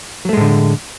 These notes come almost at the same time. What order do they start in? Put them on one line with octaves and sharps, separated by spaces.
F#3 A3 G#3 A2 D3